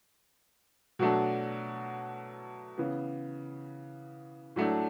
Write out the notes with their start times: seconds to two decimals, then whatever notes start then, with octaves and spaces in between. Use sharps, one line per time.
0.99 B2 F#3 A3 D4
2.78 C#3 E3 B3
4.56 A2 F#3 A3 D4